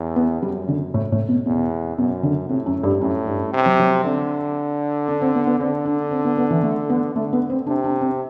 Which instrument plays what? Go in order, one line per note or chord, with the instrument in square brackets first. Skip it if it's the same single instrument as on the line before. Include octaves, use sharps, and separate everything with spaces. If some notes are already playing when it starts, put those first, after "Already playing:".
Already playing: [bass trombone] E2
[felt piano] B3
[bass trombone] F#2 [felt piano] G3
[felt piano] D3
A2
A2
B2
[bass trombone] E2 [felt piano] B2
[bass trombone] F#2 [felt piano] B2
[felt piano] D3
[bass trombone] A2 [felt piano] C3
[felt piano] F#2
G2
[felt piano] F#2 [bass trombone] A2
[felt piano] G2
[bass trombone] C3
[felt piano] F#3
F#3
[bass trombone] D3 [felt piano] C4
[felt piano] D4
C4
B3
B3
[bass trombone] D3 [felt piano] C4
[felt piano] D4
C4
B3
B3
E3
A3
B3
[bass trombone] D3 [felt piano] A3
[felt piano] B3
C4
[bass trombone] C3 [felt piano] D4
[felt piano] D4
C4